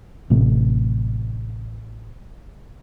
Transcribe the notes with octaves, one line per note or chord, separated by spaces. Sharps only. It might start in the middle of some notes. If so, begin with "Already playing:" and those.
A1 C3 A3